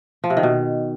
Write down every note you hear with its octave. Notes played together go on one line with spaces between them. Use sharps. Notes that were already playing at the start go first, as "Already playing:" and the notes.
F3
C3
D#3
B2